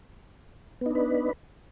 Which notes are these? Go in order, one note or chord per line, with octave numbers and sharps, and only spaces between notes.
B3 D4 D#4 B4